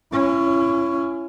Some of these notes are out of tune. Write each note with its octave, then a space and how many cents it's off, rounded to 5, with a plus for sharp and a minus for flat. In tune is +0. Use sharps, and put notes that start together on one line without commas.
C#4 +0 E4 +40